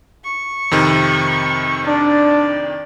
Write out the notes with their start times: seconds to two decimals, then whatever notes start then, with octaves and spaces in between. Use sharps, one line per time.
0.24 C#6
0.71 F2 C3 D#3
1.87 D4 D5